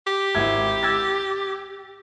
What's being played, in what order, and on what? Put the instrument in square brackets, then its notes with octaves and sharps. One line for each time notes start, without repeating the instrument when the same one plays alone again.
[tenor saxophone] G4
[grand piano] G#1 E4 G#6
E6 G#6 A6